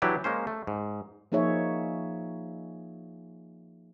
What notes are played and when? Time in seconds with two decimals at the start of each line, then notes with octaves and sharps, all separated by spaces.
0.02 E3 F#3 D4 E4 G4 B4
0.24 G#3 A#3 C#4 C5
0.47 A3
0.67 G#2
1.32 F3 A#3 D#4 G#4 C#5 E5